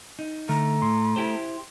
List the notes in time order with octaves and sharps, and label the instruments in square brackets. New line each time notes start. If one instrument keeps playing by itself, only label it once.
[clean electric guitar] D#4
[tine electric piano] D3 [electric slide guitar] A3 [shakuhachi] A#5
[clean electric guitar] A2 [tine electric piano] C6
[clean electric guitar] E4 G4 C5